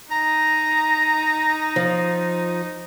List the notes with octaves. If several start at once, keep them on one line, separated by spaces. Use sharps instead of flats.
D#4 A#5
F3